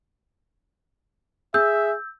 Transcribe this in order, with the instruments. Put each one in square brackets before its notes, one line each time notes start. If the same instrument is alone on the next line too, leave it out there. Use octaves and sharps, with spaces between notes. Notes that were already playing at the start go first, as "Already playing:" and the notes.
[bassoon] G#4 [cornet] E5 [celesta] E6 G6